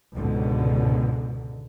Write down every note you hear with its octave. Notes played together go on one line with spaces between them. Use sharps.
C#2 G#2 B2 D3